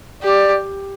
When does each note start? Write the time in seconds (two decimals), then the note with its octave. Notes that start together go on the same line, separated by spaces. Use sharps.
0.23 G4 D5